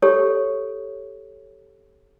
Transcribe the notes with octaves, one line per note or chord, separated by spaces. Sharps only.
G4 A4 C#5